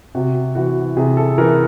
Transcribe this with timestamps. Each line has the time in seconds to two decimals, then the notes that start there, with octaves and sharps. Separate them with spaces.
0.15 C3 F#4
0.55 E3 F#4
0.97 C3 G#4
1.17 A4
1.38 E3 A#4